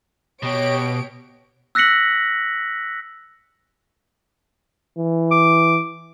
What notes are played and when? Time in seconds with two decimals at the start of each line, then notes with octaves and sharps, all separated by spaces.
0.43 B2 G4 C#5 D7
1.75 E6 F#6 A#6 B6 C#7 F#7
4.97 E3
5.31 D6